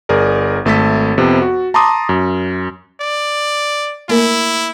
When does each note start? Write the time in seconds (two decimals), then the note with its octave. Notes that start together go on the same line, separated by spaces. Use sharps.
0.09 G1 G#4 A#4 D5
0.65 G#1 A3 A4 A6 B6
1.18 F2 C3 B3
1.42 F#4
1.74 A5 A#5 C6 D6 D#6
2.09 F#2
3.01 D5
4.09 A3 A#3 E4 A#4